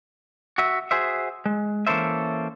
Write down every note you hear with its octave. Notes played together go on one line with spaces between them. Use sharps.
F#4 E5
F#4 G#4 C5 E5
G#3
E3 A#3 C#4 A4 C5 E5